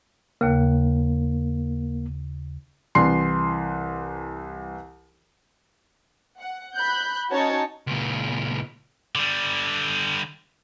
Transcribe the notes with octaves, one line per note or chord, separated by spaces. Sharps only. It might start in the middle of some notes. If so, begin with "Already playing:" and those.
D#2 C#3 A#3
C2 E3 C6 C7
F#5
B5 F#6 G6
C#4 D#4 F#4 C#5 A5
C#2 A#2
D3 G3